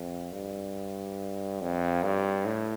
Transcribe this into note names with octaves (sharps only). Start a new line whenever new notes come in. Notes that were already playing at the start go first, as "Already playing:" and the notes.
Already playing: F2
G2
F2
G2
A2